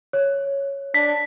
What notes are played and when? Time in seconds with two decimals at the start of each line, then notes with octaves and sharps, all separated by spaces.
0.13 C#5
0.94 D4 B6